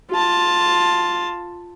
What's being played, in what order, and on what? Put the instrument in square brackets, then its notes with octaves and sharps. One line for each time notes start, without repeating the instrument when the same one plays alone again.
[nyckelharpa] F4 A5